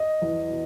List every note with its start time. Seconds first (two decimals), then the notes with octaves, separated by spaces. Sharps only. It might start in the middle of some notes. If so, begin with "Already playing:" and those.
Already playing: D#5
0.22 E2
0.50 B2